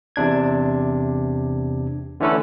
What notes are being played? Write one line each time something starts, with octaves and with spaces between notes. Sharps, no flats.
E2 C3 D4 G#6
D3 E3 A3 C#4 A4 B4